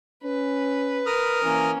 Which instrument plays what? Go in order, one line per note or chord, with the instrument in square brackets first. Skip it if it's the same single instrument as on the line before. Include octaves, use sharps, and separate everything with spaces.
[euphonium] C#4 [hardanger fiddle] B4
[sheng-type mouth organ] A#4 D#6 F6
[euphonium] E3 [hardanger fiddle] A#3 C#4